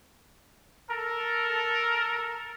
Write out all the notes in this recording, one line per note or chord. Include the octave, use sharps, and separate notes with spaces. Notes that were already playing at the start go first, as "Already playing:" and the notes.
A4 A#4